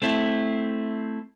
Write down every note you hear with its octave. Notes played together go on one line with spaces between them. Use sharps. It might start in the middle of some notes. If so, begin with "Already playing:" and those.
A3 C4 E4